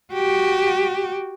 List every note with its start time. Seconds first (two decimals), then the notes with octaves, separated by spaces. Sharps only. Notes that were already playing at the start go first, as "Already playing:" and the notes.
0.13 F#4 G4